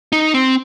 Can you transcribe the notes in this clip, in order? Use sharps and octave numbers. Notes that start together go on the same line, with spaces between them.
D#4
C4